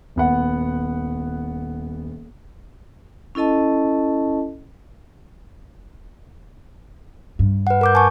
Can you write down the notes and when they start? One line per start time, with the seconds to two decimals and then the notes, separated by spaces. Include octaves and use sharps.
0.16 D#1 B3 F#5
3.35 C#4 E4 A4 D#5 A5
7.39 G2
7.67 B4 F#5
7.81 A#4 D6 G6
7.95 G#5 A5 C#6